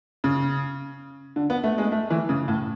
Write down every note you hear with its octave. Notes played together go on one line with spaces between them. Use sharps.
C#3
D3
B3
A3
G#3
A3
E3
C#3
A2